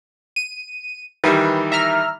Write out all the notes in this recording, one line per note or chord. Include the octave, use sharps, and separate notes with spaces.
D#7
D#3 E3 G3 B4
E5 A#5 F6